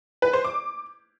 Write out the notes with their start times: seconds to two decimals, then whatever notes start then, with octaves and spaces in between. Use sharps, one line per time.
0.22 B4
0.33 C5
0.45 D6